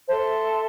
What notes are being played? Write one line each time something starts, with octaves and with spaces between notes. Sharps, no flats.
A4 C5 E5 A5 C6